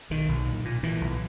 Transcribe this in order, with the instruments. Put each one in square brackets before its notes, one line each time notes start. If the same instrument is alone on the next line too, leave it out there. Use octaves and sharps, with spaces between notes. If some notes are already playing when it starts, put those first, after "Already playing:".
[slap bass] B1 D#3
B1
A#2
A#2
A#2 E3
B1